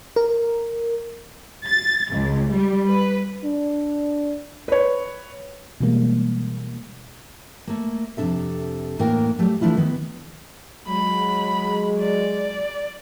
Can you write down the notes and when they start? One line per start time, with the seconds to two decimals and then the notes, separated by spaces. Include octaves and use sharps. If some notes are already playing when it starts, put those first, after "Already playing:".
0.16 A#4
1.67 A6
2.11 C#2
2.52 G3
2.88 B4
3.44 D4
4.68 B4 C#5
5.80 B2 E3 G3 G#3 A#3
7.67 A3 A#3
8.17 F2 C3 E3 D4 A4 E5
8.99 E2 A2 A#3 D4 A#4 G5
9.39 F#3 G3 A3
9.61 E3 A3 D4 E4 F4
9.77 D#3 B3
10.87 F#3 G#3 B5
11.99 D5